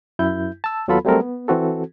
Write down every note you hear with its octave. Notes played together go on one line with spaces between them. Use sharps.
F#2 E4 G6
A5 E6
D#2 F#3 B3 F4 A4 B5
F#3 G3 A3 C4 A4 A#4
B3
E3 C4 F#4 A4